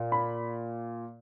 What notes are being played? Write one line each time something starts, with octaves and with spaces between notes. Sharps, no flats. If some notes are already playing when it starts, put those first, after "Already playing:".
Already playing: A#2
B5